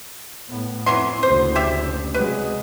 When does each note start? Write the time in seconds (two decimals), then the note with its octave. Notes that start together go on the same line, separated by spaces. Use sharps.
0.49 A2 B3
0.86 F2 E3 F#3 C6
1.23 F#1 D2 C5
1.56 G4 E5
2.14 C3 F#3 G#3 B4